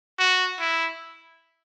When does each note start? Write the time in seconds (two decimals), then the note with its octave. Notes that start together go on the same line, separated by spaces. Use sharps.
0.19 F#4
0.60 E4